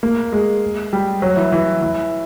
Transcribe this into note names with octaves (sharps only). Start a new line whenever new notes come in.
A#3
G#3
G3
F#3
E3
E3
E3